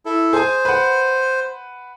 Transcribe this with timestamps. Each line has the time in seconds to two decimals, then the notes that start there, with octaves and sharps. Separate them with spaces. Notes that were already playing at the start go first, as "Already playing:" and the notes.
0.06 E4 A4
0.33 G#4 C5 G#5
0.65 B4 F#5